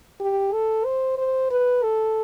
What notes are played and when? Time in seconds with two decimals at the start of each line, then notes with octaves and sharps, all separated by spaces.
0.20 G4
0.53 A4
0.85 C5
1.18 C5
1.51 B4
1.83 A4